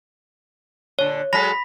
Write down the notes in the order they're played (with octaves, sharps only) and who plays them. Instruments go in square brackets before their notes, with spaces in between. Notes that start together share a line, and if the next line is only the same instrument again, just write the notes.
[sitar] A#2 D3 [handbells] C#5
[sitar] F#3 G#3 A4 [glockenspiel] B5 B6 [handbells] A#6